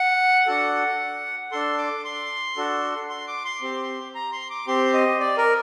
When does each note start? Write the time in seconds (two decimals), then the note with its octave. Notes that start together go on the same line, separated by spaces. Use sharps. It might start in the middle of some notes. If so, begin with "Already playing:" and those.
Already playing: F#5
0.47 D4 F#4 A4
1.52 D4 A4 C6
1.78 D6
2.04 C6
2.57 D4 F#4 A4
3.10 C6
3.27 D6
3.45 C6
3.62 C4 G4
4.15 A#5
4.32 C6
4.50 D6
4.67 C4 G4 C6
4.93 D#5
5.20 D5
5.38 A#4